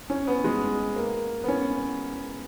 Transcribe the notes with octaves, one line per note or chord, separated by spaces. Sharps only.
C#4
B3
G#3
A#3
B3
C#4